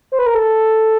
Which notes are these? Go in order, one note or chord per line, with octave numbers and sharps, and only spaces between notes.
C5
B4
A#4
A4